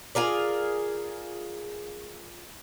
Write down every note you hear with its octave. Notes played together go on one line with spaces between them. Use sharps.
F4 G#4 A#4 D5